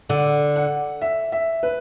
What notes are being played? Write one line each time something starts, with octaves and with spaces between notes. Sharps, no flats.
D3 F#5
F#5
E5
E5
B4